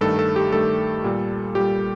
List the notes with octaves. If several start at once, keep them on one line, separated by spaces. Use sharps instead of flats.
G2 D#3 A3 A4
A4
G4
G2 D#3 A3 A4
A#2 G3
A#2 G3 G4